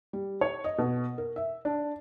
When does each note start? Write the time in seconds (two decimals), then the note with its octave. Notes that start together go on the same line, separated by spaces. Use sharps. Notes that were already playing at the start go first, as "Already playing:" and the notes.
0.13 G3
0.41 C#5
0.64 D#5
0.78 B2
1.18 A#4
1.36 E5
1.65 D4